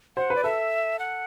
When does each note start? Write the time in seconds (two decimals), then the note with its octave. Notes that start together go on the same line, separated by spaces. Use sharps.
0.17 C5 F#5
0.30 B4
0.35 D5
0.44 A4 E5
0.99 F#5